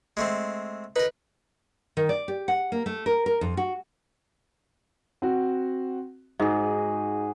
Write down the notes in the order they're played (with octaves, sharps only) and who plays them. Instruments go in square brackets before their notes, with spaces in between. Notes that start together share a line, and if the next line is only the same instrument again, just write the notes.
[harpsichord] G#3 A3 C4
[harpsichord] D#4 A#4 [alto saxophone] B4
[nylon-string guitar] D#3
D5
G4
F#5
A#3
A3
A#4
A#4
F2
F#4
[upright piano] C4 F#4
[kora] G#2 [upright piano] D#4 [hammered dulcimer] F#4 G#4